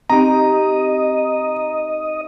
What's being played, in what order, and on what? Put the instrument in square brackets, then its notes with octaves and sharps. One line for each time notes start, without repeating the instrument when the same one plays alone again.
[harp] C4 D#4 G4 [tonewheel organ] D#5 [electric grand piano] A#5